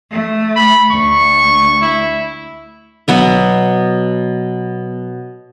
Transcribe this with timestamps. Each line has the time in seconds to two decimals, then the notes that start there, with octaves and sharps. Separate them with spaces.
0.10 A3
0.56 B5
0.91 D2 C#6
1.81 E4
3.08 B2 F#3 B3 E5